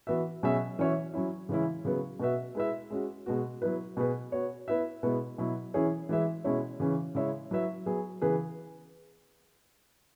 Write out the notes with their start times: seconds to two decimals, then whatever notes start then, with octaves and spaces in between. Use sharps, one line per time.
0.07 E3 B3 F#4 E5
0.43 B2 F#3 C#4 G#4 E5
0.79 E3 C#4 F#4 C#5 E5
1.14 F#3 C#4 E4
1.49 C#3 E3 G#3 C#4 E4
1.85 C#3 F#3 B3
2.20 B2 B3 F#4 B4 E5
2.55 G#3 E4 B4 E5
2.90 G#3 C#4 F#4
3.26 B2 G#3 B3 F#4
3.62 F#3 B3 E4 B4
3.97 B2 B3 G#4 B4
4.32 B3 F#4 C#5
4.68 B3 E4 B4 E5
5.03 B2 G#3 B3 E4
5.38 B2 F#3 E4
5.74 E3 C#4 E4 G#4 C#5
6.09 E3 G#3 E4 B4 E5
6.44 B2 G#3 C#4 E4 C#5
6.80 C#3 E3 C#4
7.15 C#3 G#3 E4 C#5 E5
7.51 F#3 E4 B4 E5
7.86 F#3 B3 G#4
8.22 C#3 E3 B3 G#4 B4